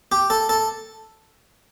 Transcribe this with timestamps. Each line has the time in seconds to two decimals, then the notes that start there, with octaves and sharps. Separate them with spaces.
0.12 G4
0.30 A4
0.49 A4